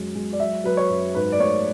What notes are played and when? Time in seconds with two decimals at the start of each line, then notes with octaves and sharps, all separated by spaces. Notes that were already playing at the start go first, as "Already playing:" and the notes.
Already playing: F#2 F#3 G#3
0.15 G#3
0.33 D5
0.40 F#3 E5
0.64 F#3 B4
0.77 C#5
0.89 F#2
1.15 G#2 B4
1.32 D5
1.40 A3 C#5